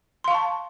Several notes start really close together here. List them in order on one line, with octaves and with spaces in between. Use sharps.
C6 F5 C#6 A5